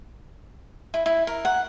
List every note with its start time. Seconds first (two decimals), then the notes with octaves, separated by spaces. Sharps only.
0.94 E4
1.06 E4
1.27 A#4
1.45 F#5